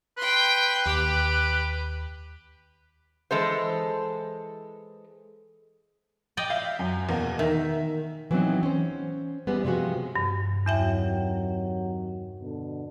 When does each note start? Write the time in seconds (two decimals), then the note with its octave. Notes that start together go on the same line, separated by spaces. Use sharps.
0.18 B4 G5 C6
0.86 D#2 G4
3.31 E3 G#3 A4 C5
6.37 D5 D#5 G5
6.49 E5 F5 G6
6.79 F#2
7.09 E2 B2 A#3
7.39 D#3 E5
8.31 E3 F#3 A3 B3 C4 D#4
8.63 C#4 C5
9.47 E3 G3 G#3 B3
9.65 C3 F3 G#3 F#4
10.16 G2
10.66 E2 C3 D#3 F#3 E5 G5
12.40 B2 D3